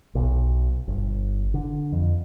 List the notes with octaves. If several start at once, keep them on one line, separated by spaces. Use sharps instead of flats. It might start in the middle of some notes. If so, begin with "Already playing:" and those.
B1
G1
D3
F2